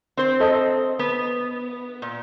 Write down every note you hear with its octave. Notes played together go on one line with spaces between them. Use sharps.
C4 C5
A4 D#5
B3
A#2